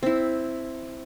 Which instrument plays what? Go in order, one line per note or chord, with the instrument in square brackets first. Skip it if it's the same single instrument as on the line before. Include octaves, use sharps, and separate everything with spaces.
[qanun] C4 E4